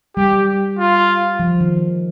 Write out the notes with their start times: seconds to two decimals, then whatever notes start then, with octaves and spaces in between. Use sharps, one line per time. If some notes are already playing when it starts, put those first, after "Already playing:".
0.16 G3 G4
0.79 F4
1.40 F3
1.61 D#3